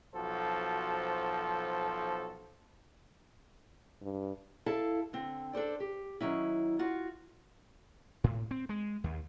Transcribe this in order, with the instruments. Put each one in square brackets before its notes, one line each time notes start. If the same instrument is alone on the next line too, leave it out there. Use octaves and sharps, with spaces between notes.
[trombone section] B1 F3 F#4 A4 C5
[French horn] G2
[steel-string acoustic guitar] E4 A4 F5 A5
D3 C4
D4 A4 C5 D5
G4
D#3 F#3 C#4 E4
F4 F#4
[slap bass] A2
C4
G#3
D#2